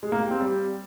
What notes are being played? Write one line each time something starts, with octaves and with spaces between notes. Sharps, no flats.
G#3
A#3
G4
C4
G3